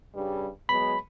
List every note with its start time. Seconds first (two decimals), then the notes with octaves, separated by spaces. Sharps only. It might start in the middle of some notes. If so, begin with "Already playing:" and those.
0.15 G2 C#3 G3
0.69 F#3 G#3 B3 B5